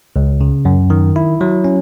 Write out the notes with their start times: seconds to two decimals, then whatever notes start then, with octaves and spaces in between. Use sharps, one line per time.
0.16 C#2
0.41 C#3
0.65 F#2
0.90 D#3
1.16 E4
1.41 F#3
1.65 C#4